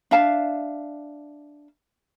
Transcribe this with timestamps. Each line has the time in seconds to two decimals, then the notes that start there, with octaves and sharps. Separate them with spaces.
0.11 D4 E5 F5 A5